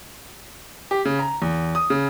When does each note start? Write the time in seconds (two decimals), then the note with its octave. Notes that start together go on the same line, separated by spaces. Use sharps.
0.91 G4
1.05 C#3
1.19 A#5
1.42 E2
1.75 D#6
1.90 C#3